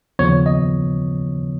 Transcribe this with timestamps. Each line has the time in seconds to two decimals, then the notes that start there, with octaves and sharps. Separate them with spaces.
0.19 D#2 C#3 F3 B3 C#5
0.46 D#5